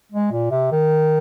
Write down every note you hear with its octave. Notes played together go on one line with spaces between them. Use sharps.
G#3
A#2
C3
D#3